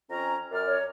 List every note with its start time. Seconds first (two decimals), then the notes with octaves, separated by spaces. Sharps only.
0.10 F2 C#4 A#5
0.51 F#2 D5 F6
0.66 C#5